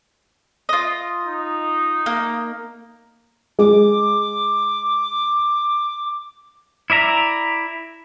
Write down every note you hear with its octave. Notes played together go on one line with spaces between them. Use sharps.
F4 D#5
D#4
A#3
G#3 D6
E4 D5 E5 A#5